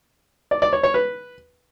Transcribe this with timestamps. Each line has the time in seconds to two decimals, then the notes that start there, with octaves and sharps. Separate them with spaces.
0.51 D5
0.62 D5
0.73 C#5
0.83 C#5
0.94 B4